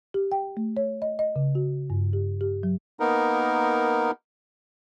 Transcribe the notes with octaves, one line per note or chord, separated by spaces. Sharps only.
G4
G5
A3
C#5
D#5
D#5
C#3
F#4
G2
G4
G4
F#3
A#3 B3 D#4 A#4